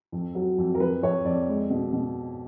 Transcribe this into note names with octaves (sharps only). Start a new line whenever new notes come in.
F2
F#3
F2
A#4
F2 B4
F2 C#5
F2 D5
G#3
B2
B2